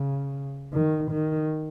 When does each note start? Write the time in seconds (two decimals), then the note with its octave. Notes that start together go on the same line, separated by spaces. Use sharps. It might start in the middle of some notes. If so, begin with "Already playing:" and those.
Already playing: C#3
0.73 D#3
1.11 D#3